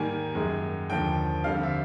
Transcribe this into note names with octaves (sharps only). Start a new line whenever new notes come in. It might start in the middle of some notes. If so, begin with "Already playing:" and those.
Already playing: G#2 D#3 G3 A#3 G#5
F#2 D#3 G#3
D#2 D3 F3 G5
F2 D3 G3 F5
E5